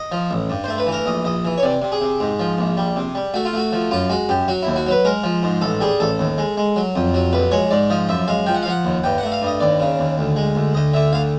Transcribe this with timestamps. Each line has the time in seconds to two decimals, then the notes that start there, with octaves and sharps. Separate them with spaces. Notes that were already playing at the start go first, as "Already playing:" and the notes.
Already playing: D#5
0.12 F3
0.31 A1
0.50 G2
0.64 A3 C5
0.78 B4
0.87 E3
0.92 A#4
1.06 A#1 D#5
1.25 A#1 D#5
1.45 E3
1.58 C#5
1.63 C3 D5
1.82 C3
1.92 G#4
2.01 C3
2.20 G#2
2.39 F3
2.59 A#1
2.77 G3
2.96 C3
3.15 G3
3.34 A3 F#4
3.45 F4
3.53 A3 F#4
3.73 F3
3.91 F#2 F4
4.10 G#3 F#4
4.29 F#2 G4
4.48 F#3 F#4
4.63 D#2 E4
4.76 F#4
4.87 F#3 B4
5.05 G#3 A#4
5.24 F3
5.43 G#2
5.61 A1 A4
5.81 G3 G#4
6.00 A1 A4
6.19 D#2
6.38 G#3
6.57 G#3
6.76 F#3
6.96 F2
7.14 F#3
7.33 A#1 B4
7.51 G#3 C#5
7.71 G#2 D5
7.90 F3 D#5
8.09 F#2 E5
8.28 G#3 F5
8.46 F3 G5
8.55 F#5
8.63 F5
8.66 F3 F#5
8.85 D#2
9.04 G2 G5
9.18 A3 F#5
9.32 F5
9.42 G2 D#5
9.61 D#2 D5
9.80 C#3
9.99 D#2
10.18 D2
10.36 G#3
10.55 D2
10.75 D2 D#5
10.94 D3 E5
11.13 D2 F5